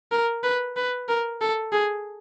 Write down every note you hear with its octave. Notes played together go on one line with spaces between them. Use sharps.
A#4
B4
B4
A#4
A4
G#4